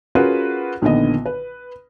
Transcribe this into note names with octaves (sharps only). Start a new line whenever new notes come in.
C#4 F4 F#4 G#4 A#4 B4
A#1 D3 D#3 B3 D#5
B4